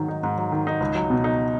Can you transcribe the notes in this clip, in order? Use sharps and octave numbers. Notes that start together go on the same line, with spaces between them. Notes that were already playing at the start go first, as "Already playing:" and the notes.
Already playing: G#2 D#3 F#3
D#4
G#2
F#3
D#3
D#4
C#2
F#3
B2
D#4